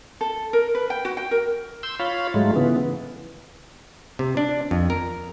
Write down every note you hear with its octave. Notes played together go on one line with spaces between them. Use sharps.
A4
A#4
B4
G5
F#4
G5
A#4
C6 E6 G6
F4 C#5 F5 B5
G#2 F#3 G#3 A3 F4
C#3 E3 B3
C3
D4
F2
A#4